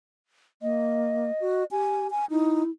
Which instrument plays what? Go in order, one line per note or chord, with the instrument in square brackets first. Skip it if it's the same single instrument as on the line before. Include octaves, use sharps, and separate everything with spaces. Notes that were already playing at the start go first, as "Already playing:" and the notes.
[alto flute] A#3 [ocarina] D#5
[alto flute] F#4
[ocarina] G4 [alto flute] G#5
[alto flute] G#5
[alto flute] D#4 [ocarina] E4